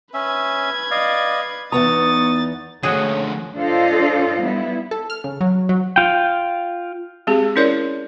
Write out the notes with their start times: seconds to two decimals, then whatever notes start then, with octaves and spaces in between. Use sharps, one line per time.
0.14 C#4 B4 E5 G#6
0.91 D5 D#5 F5
1.72 E2 B3 D#4 A#5 C#6 D#6 A6
2.83 D3 F3 A3 C#4 F#4 G#4
3.56 D4 F4 A4 C5 D#5 F5
4.41 G3 B3 E4
4.91 A4
5.10 F6
5.24 C#3
5.41 F#3
5.69 F#3
5.96 F4 G5
7.27 G#3 C4 G4 G#4
7.56 C#4 E4 A#4 C#5 D5